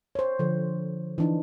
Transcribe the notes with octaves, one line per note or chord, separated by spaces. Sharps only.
C5 C#5
D3 F3
E3 D4 D#4